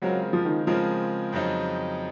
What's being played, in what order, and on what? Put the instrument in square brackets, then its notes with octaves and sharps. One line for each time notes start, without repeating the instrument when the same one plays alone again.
[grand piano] C#3 G#3 C4 F4 A#4 [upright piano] F#3
[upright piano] F3
D#3
[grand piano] C#3 G#3 C4 F4 A#4 [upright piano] F3
[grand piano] F2 C#3 F#3 C4 D#4